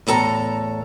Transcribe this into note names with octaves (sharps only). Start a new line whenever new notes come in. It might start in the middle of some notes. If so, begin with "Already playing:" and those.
E2 A2 A4 A#5